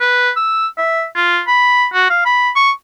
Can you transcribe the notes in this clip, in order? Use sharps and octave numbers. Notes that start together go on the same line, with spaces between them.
B4
E6
E5
F4
B5
F#4
F5
B5
C#6